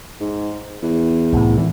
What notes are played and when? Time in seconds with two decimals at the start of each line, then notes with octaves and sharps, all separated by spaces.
0.20 G#2
0.82 E2
1.33 C2 A2
1.57 G#1 E3